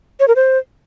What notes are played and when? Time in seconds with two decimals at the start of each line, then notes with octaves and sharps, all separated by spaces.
0.20 C#5
0.28 A#4
0.36 C5